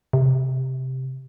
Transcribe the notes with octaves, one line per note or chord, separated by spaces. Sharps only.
C3